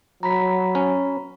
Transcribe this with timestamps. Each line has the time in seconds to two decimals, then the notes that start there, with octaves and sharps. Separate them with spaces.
0.23 F#3 A#5 B5 B6
0.75 C#4